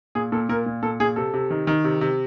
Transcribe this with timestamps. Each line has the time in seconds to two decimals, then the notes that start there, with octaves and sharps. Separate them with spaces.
0.15 A#2 G#4
0.32 A#2 A4
0.49 A#2 A#4
0.66 A#2
0.83 A#2 A4
1.00 A#2 G#4
1.16 C3 A4
1.34 C3
1.50 D#3
1.67 D#3
1.84 C3
2.01 C3